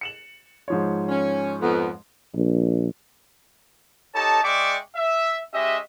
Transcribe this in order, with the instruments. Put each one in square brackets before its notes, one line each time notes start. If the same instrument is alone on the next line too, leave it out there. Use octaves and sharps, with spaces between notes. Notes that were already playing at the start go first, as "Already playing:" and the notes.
[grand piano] C#7 E7 F#7
G#2 F3 C#5
[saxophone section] C#4
F2 B3
[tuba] A#1
[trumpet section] D#4 G4 A4 C#5 A5
G#3 D5 E5 G5 C#6 D6
E5
G#3 C#4 G4 D#5 E5